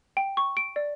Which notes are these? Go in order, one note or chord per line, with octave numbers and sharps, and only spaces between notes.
G5
C#6
D7
D5